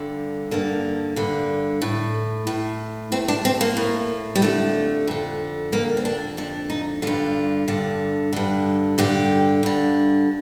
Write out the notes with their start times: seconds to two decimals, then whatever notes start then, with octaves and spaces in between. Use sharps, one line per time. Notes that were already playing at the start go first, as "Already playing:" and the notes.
Already playing: G2 D3
0.51 G2 D3 A#3
1.16 G2 D3
1.82 A2
2.47 A2
3.12 A2 C4
3.28 D4
3.45 C4
3.61 A#3
3.77 A2
4.35 G3
4.42 F2 D3 A3
5.07 F2 D3
5.72 F2 D3 A#3
5.97 C4
6.05 D4
6.37 F2 D3 D4
6.70 D#4
7.02 G2 D3 F4
7.68 G2 D3
8.33 G2 D3
8.98 G2 D3 G4
9.63 G2 D3